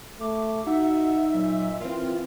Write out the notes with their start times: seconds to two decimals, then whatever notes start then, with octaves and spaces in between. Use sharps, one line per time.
0.20 A3 D6
0.67 D#4 F#4 E5 F#5
1.34 A#2 F#3
1.81 E3 C4 F4 A#4